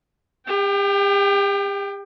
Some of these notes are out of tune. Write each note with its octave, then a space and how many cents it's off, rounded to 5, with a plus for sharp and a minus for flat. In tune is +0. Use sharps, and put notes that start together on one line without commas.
G4 +40 G5 +0